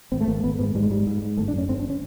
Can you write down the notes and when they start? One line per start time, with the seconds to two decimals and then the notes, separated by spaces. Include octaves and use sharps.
0.12 G#1 C4
0.21 A3
0.28 G#1 A#3
0.44 G#1 B3
0.59 G#2 B3
0.75 G#2 G3
0.83 G#3
0.91 G#2 G3
1.07 G#2
1.22 G#2
1.37 G1 A3
1.48 D4
1.53 F#2
1.58 C#4
1.68 G1 C4
1.79 D4
1.90 C#4